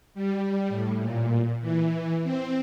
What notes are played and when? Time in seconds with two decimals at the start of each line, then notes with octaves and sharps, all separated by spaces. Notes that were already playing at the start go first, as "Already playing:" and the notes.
0.14 G3
0.69 A2
1.00 A#2
1.61 E3
2.24 C4